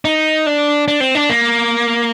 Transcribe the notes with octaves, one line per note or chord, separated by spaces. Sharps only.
D#4
D4
D4
C4
D4
A#3